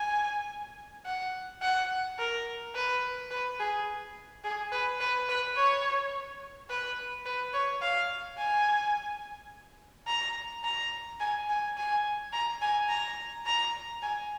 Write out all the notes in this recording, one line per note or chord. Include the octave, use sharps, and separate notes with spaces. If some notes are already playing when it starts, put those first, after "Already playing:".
Already playing: G#5
F#5
F#5
A#4
B4
B4
G#4
G#4
B4
B4
B4
C#5
B4
B4
C#5
F5
G#5
A#5
A#5
G#5
G#5
G#5
A#5
G#5
A#5
A#5
G#5